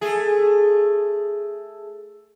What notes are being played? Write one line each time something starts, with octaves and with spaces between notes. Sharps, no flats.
A3 G#4